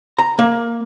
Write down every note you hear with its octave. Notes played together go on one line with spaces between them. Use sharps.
A#5
A#3